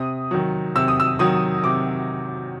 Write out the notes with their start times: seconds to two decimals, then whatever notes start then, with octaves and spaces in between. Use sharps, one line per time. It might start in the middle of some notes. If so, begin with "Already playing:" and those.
Already playing: C3 D#6
0.31 D#3 F#3
0.75 C3 E6
0.88 D#6
1.00 E6
1.19 D#3 F#3 D#6
1.64 C3 D6